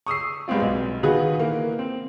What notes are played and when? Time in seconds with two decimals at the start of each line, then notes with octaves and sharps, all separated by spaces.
0.06 C#6 D#6 E6 C7
0.48 G3 G#3 B3 C4 F4
0.62 B1
1.03 D#3 B3 F4 F#4 G#4 B4
1.39 E3 A#3 A#4
1.79 C4